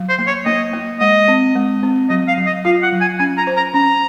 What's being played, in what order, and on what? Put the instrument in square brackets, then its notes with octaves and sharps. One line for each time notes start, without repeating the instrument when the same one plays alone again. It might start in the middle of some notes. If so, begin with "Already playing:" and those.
Already playing: [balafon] F#3
[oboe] C5
[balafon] A#3
[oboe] C#5
[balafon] A#3 [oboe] D#5
[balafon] A#3
[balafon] G#3 [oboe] D#5
[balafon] C4
G#3
C4
[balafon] F#3 [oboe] D#5
[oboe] F5
[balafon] F#3
[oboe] D#5
[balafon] F4 [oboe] F5
[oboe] F#5
[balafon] F#3
[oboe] G#5
[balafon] C#4 [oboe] G#5
[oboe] A#5
[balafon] C5
[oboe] A#5
[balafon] C#4 [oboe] A#5